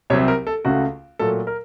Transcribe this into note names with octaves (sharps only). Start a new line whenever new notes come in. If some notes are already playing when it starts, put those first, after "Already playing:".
C2 C3 F#3 C4 C#5
A#4
A4
C#2 C#3 A3 F#4
A#2 F#3 A3 A4
A#4